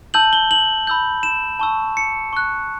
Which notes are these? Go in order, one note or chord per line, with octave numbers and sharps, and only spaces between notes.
A5 E6 G6 F#7
G7
F#7
B5 E6 G6
E7
A5 C#6 E6
C#7
C#6 F#6